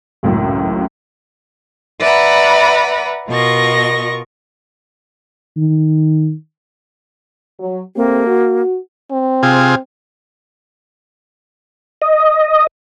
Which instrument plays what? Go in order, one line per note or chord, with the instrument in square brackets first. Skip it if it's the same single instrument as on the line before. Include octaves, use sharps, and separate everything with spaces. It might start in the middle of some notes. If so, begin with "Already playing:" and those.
[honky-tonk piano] G#1 C#2 F#2 A2
[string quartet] B4 D5 E5 F#5 A#5 B5
B2 F4 A#4 D#5 C#6 A#6
[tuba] D#3
[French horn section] F#3
[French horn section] A3 C4 G4 [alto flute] A#3
[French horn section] F#4
[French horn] C4
[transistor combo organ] C3 F4 G#4
[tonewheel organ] D#5